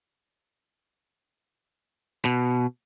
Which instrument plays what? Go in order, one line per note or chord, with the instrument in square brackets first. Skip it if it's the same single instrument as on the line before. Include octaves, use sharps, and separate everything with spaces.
[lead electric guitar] B2